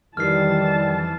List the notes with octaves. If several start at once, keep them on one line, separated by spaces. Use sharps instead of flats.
F2 D#3 E3 G3 A5 F6 C7